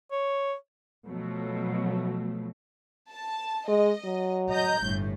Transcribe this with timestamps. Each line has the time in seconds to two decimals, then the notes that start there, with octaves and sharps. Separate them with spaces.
0.12 C#5
1.06 B2 F3 F#3 A3
3.11 A5
3.68 G#3 D#5
4.04 F#3
4.50 D#5 A#5 G6
4.83 G1 A2